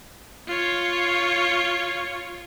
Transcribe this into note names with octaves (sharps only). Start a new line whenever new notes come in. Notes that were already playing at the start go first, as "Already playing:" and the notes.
F4 C#5